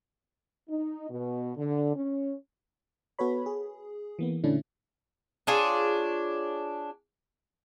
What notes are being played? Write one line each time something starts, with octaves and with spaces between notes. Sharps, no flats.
D#4
B2
D3
C#4
B3 F#4 A4 B4 C#5 B5
G#4
E3 A#3 B3
A#2 D3 A3 C#4 D4 E4
D4 F4 G#4 C#5